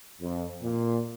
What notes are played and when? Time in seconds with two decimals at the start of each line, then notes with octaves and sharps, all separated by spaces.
0.21 F2
0.63 A#2